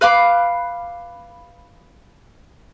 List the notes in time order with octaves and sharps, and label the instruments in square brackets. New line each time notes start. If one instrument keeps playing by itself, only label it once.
[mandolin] B4 F5 B5 D6